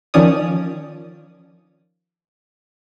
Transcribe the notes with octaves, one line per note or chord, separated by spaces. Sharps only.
D#3 F3 C#4 C#5 D5 D#6